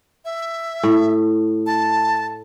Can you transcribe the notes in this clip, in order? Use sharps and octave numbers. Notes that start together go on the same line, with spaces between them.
E5
A2
A5